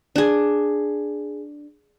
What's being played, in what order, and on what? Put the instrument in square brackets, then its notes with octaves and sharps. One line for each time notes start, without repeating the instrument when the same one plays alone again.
[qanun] D4 G#4